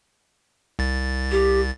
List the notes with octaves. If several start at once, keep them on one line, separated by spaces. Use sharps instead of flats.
C2 A6
G4